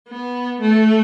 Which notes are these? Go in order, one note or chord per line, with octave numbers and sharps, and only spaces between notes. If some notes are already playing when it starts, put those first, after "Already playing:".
B3
A3